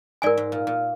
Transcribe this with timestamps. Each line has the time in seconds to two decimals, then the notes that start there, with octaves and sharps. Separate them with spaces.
0.22 G#2 A#4 D5 G#5
0.37 G#2
0.52 A#2
0.67 A#2